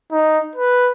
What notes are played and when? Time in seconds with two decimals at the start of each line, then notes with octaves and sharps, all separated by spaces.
0.12 D#4
0.56 B4